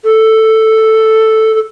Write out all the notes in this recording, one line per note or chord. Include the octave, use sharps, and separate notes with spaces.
A4
A4